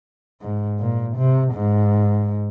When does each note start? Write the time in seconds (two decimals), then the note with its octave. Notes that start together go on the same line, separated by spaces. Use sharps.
0.42 G#2
0.80 A#2
1.17 C3
1.55 G#2